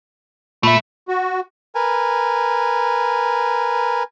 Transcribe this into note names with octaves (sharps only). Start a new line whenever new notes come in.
A#2 A3 E5 B5
F#4
A#4 B4 G#5